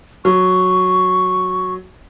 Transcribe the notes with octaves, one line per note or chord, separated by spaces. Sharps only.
F#3 C#6